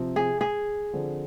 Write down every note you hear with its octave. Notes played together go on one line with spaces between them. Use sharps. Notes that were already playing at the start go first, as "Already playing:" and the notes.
Already playing: C3 F3 C4
G#4
G#4
D3 F3 C4